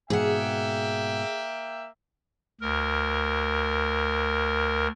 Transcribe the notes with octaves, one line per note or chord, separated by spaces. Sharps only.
G#2 B2 A#3 G#4 E5 F#5 G5
D2 A#4